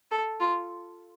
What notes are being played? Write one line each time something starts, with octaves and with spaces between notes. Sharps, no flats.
A4
F4